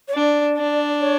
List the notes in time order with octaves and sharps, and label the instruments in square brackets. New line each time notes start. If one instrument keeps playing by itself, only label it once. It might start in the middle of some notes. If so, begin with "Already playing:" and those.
[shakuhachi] C#5
[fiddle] D4 [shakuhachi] D5
[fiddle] D4
[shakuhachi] C#5